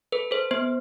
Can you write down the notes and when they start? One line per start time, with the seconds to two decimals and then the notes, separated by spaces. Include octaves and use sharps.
0.12 A4 B4
0.31 A4 C5
0.51 B3 C5